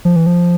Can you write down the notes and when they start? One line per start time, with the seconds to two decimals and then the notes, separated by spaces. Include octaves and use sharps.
0.05 F3
0.16 E3
0.26 F3